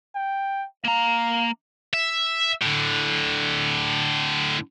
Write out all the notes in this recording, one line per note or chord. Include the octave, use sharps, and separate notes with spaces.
G5
A#3 F5 A#5
E5
A2 D3